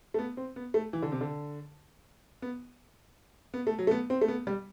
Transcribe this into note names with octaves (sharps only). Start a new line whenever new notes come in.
A3
B3
C4
B3
A3
E3
D3
C3
D3
B3
B3
A3
F#3
A3
B3
C4
A3
B3
G3